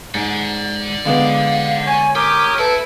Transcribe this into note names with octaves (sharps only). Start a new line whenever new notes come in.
G#2 D5 F#5
D3 G#3 B3 F5
C#5 G#5
G4 A#4 C#5 D6 D#6
E4 A4 B4